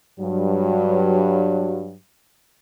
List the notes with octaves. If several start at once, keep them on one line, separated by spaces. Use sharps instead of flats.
G2 F#3